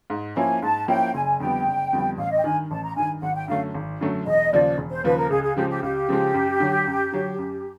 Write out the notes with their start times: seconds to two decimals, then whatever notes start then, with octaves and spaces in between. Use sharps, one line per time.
0.10 G#2
0.36 F3 A#3 C#4 E4 G#5
0.62 G#2 A5
0.88 F3 A#3 C#4 E4 G5
1.14 F#1 G#5
1.40 F2 D3 G3 B3 G5
1.66 F#1
1.93 F2 D3 G3 B3
2.18 A1 F5
2.31 D#5
2.38 G5
2.44 G2 D#3 G#5
2.71 A1 A5
2.83 A#5
2.96 G2 D#3 G#5
3.22 G#1 F#5
3.35 G5
3.48 F#2 D3 F#3 A3 F5
3.74 G#1
4.00 F#2 D3 F#3 A3
4.26 E1 D#5
4.53 D#2 C#3 F3 D5
4.78 E1
4.91 C5
5.04 D#2 C#3 F3 B4
5.17 A#4
5.30 C#2 G#4
5.43 G#4
5.56 C#3 F3 G#3 G4
5.70 G4
5.83 C#2 G4
6.09 C#3 F3 G#3
6.34 F#2
6.60 D3 F#3
6.87 F#2
7.12 D3 F#3
7.38 F#2